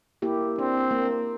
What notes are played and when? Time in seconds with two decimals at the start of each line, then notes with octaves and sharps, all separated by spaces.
0.22 A#3 E4 G4
0.58 C4 D4
0.91 A#3